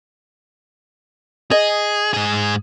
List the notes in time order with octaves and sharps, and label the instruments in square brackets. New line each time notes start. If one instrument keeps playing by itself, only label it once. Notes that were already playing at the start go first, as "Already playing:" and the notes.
[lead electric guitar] G#4 [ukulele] D#5
[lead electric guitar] G#2 G#4